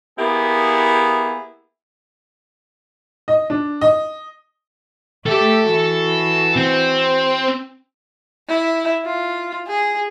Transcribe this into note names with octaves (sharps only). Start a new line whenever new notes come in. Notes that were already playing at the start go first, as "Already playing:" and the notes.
A#3 B3 E4 G4 G#4
D#5
D4
D#5
A3 G4 A4 E5
E3 F#4
C4
E4
F4
G#4